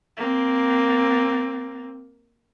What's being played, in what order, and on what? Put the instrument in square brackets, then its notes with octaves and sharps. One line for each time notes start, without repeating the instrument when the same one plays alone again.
[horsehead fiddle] A#3 C4